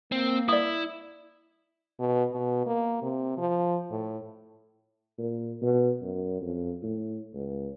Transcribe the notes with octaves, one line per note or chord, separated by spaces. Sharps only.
A#3 C4
E4 D5 D#6
B2
B2
A#3
C3
F3
A2
A#2
B2
F#2
F2
A2
C#2